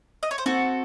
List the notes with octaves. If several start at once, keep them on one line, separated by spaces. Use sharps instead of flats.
D#5
C#5
C5
C4 F#4 A4